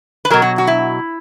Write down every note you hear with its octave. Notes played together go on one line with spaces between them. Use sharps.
B4
B2 F#3 A#4
F#4
F#4
E4